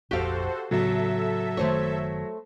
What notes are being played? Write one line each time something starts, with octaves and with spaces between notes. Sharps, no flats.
F1 A#1 F2 F#4 G4 A4 C5 F5
A2 C#3 F#3 B3 A4 E5
F#1 D#3 A3 C5 C#5